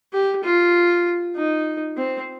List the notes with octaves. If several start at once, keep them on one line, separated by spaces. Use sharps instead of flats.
G4
F4
D#4
C4